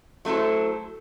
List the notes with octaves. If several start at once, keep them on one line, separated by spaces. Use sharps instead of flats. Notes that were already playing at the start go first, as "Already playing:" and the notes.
F#3 A3 E4 A4 C5